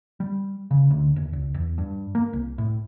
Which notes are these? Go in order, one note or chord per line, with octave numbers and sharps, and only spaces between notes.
G3
C#3
D2
D#2
C#2
E2
G2
A#3
C2
A2